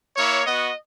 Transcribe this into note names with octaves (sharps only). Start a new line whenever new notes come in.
A#3 E4 C#5
B3 F#4 D#5